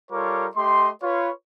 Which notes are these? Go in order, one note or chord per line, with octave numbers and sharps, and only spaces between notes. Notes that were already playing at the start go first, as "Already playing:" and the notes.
G3 F4 A4 A#4 C#5 D6
A3 G4 D#5 C6
F4 B4 C#5